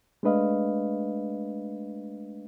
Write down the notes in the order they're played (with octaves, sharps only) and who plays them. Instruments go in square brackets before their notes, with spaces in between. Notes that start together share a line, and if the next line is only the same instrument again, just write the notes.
[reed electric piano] G#3 A3 D4 B4 D#5 F5